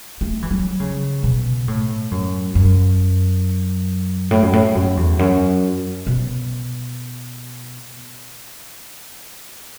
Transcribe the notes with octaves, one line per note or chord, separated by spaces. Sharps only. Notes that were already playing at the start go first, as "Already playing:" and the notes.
A3
E3
F#3
C#3
B2
A2
F#2
F#2
A2
F#2
A2
F#2
E2
F#2
B2